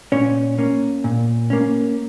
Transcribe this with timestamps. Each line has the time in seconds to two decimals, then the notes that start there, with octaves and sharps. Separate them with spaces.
0.12 A#2 C#4 C#5
0.58 A#3 C#4
1.04 A#2
1.50 A#3 C#4